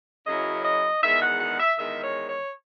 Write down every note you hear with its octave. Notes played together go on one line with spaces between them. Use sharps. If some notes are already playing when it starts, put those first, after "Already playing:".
F#2 C#3 F#3 C#4 E4 D#5
D#5
E2 D#3 G#3 D#4 E5
F#5
F#5
E5
E2 D#3 G#3 D#4 E5
C#5
C#5